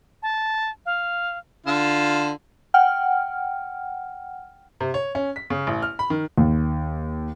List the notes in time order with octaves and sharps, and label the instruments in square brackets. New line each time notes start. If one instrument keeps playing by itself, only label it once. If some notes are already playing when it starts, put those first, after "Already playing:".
[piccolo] A5
F5
[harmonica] D3 F4 [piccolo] E7
[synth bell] F#5 G5 F6
[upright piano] C3
C#5
C#4
B6
C#3
A1
F6
B5
D#3
[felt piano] D#2